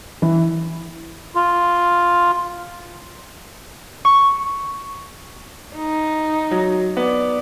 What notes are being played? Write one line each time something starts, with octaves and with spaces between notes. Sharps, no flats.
E3
F4
C#6
D#4
F#3
B3 D5